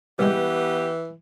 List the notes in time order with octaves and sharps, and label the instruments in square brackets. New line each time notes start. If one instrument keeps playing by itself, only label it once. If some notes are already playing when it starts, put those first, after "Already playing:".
[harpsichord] C2 G#3 [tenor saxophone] E3 [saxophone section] B3 G4